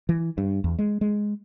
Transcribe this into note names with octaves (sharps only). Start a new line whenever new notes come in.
E3
G2
E2
G#3
G#3